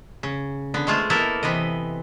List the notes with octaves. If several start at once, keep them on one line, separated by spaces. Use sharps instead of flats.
C#3
D3 B3
G#3 A3 F4 G#4 C5
A#3 B3 E4 A4 A#4 A5
C3 E3 B3 D#5